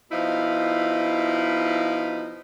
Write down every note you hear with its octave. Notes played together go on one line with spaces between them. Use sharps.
B2 F3 D#4 E4 F5